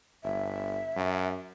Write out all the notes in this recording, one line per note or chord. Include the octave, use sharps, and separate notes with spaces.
G1 E5
F#2